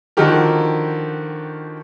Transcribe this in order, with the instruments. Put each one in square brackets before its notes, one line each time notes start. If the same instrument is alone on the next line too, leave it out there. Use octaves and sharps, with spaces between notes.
[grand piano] D3 D#3 F3 F#4 G4 A#4